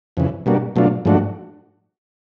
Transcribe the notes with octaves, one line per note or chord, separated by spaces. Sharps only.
F2 C#3 E3
B2 G3 A#3 D4 F#4
B2 F#3 A3 D4 F4
G#2 F3 A3 D4 F#4